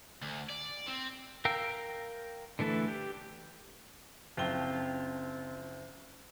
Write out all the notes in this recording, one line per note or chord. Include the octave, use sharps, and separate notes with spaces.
D2
D5
C4
A#4 F5 G5 E6
D3 E3 A3 A4 B4
G4
F#1 F3 C4 F4 G5 G7